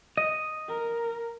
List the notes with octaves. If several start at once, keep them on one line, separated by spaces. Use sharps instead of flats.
D#5
A#4